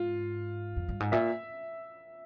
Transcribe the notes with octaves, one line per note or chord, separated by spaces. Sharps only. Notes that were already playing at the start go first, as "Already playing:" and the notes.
Already playing: G#2 F4
F2
G2
G#2
A#2 E5